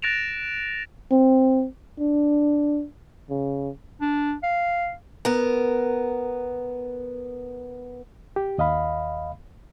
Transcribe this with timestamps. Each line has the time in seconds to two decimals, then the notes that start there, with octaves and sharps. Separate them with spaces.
0.02 F#6 A6 A#6 D7 E7 F7
1.12 C4
1.99 D4
3.30 C#3
4.01 D4
4.43 F5
5.25 B3 A#4
8.36 G4
8.58 D#2 D#5 F5 B5